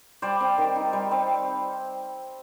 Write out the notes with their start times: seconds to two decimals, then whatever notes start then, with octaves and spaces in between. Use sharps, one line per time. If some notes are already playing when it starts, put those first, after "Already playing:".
0.22 G3 C5 D5
0.40 C4
0.58 D#3
0.76 D#4
0.93 G3
1.11 C4